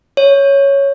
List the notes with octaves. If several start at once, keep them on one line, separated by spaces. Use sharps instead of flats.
C#5